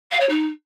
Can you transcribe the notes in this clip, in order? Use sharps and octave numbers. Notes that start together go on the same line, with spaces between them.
F5
C#5
D#4